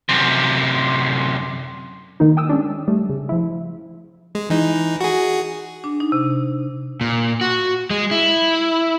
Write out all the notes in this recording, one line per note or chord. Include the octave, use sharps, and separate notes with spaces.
F#2 C3
D#3 A#3 D#4
G5 D#6 E6
G#3 C#4 D4
G3 A3
C#3
F3 E4
G#3
E3 D#4
F#4 G#4
D4
D#4
C3
A#2
F#4
G#3
E4